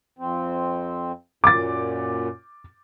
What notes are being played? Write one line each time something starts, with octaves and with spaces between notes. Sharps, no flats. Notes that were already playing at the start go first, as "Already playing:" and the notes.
F2 C4
F#2 A#2 D6 A6